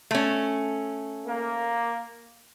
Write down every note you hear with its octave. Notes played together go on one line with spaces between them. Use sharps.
A3 C#4
A#3